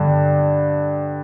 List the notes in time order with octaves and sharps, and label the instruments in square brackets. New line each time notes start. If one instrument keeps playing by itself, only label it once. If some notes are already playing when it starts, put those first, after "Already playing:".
Already playing: [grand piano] G2 D3